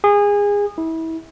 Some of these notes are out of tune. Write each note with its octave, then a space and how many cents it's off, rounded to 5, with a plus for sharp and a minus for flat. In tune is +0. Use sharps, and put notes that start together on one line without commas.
G#4 -25
E4 -30